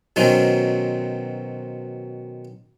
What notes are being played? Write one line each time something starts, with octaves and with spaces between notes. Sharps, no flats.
B2 D#3 F#3 C4 C#4 D#4